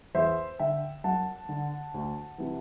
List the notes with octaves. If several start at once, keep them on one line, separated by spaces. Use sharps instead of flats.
E2 C5 E5
D3 E5 G5
F#2 F#5 A5
D3
D2
C3 E3